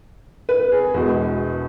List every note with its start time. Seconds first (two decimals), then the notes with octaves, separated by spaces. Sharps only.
0.49 B4
0.72 G#4
0.94 E1 E2 B2 G#3 F#4